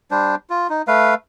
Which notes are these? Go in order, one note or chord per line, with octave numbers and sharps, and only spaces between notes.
G3 D4 C5
F4
D#4
A3 B4 F5